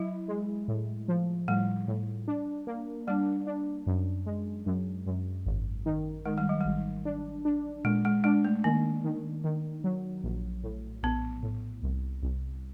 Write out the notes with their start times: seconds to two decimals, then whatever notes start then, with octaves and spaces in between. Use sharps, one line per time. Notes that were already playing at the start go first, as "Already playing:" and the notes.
Already playing: F#3 E4
0.28 G#3
0.68 A2
1.08 F3
1.48 A2 G3
1.88 A2
2.28 D4
2.67 A#3
3.07 G3 D4
3.47 D4
3.87 F#2
4.26 G#3
4.66 F#2
5.06 F#2
5.46 G#1
5.86 D#3
6.25 D#3 G#3
6.38 G3
6.49 F#3
6.61 G#1 G3
7.05 D4
7.45 D4
7.84 A#2 G#3
8.05 G#3
8.24 G#3 D4
8.44 A3
8.64 D#3 A#3
9.04 D#3
9.44 D#3
9.84 F#3
10.23 A#1
10.63 A2
11.03 A#1 B3
11.43 A2
11.83 C2
12.23 C2